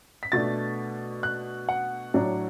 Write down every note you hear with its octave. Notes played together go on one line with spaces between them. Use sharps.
B6
B2 A3 D4 A6
F#6
F#5
A2 F#3 D4